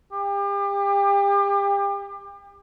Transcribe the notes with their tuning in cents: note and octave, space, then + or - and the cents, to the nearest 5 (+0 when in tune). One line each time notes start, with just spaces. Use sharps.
G4 +35